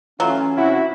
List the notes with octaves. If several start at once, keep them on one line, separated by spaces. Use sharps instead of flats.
E3 F#3 A3 C#4 F4
C3 C4 E4 F#4